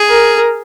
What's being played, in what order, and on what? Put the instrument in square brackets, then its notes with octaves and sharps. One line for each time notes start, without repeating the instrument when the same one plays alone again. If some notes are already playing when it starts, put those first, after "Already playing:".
Already playing: [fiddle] G#4
[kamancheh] A#4